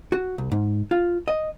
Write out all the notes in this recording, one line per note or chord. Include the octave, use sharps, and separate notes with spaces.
F#4
C2
G#2
F4
D#5